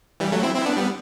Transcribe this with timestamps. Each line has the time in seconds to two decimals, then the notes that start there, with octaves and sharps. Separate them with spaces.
0.20 E3 G3
0.32 F#3 A3
0.43 C4 E4
0.55 C4 E4
0.66 B3 D4
0.77 G3 B3